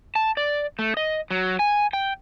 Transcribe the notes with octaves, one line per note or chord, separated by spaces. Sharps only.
A5
D5
A3
D#5
F#3
G#5
G5